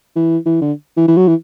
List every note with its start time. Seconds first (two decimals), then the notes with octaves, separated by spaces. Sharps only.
0.16 E3
0.46 E3
0.62 D3
0.97 E3
1.08 E3
1.17 F#3
1.27 E3